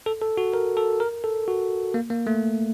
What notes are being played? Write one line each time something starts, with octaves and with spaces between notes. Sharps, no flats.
A4
A4
F#4
A#4
A4
A#4
A4
F#4
A#3
A#3
A3